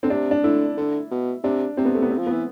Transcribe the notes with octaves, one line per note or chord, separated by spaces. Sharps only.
D3 C4
C3 D4
D4
D3 E4
D3
B2
C3 D4
C3 C4
B3
A3
B3
C4
F3
B3
E3